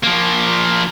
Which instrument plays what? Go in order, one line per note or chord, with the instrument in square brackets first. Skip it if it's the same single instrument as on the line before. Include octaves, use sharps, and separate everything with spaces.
[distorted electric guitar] F3 A#3